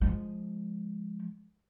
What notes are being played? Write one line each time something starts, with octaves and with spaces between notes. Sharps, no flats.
F3 G#3